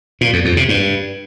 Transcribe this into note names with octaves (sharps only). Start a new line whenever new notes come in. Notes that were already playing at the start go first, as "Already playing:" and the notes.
A#2
F2
F2
C3
G2